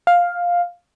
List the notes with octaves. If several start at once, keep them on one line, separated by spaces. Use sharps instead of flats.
F5